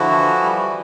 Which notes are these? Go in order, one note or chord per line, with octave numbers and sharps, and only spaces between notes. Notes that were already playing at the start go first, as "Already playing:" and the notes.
Already playing: D3 F3 E4 F#4
E3
G3